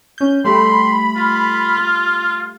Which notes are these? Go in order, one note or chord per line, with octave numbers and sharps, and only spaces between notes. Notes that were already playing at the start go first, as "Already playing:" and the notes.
C#4 G6
G3 A3 G4 B5 C6
F4